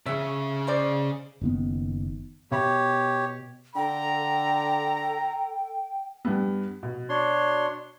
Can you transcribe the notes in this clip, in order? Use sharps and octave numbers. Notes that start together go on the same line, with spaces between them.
C#3 G#4 E5
G#3 C5 D5
F#1 D#3 B3
B2 G4 C#5 E5 B5
D3 A4 G5 A#5
G2 B3
B2
D4 C#5 C6